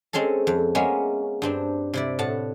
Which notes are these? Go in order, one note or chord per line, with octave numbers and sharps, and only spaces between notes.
G#3 C4 C#4 G#4 A4
F2
G#3 A#3 B3 C#4 E5
G2 C4 D4
C3 E4 D5
A2 F#5 A5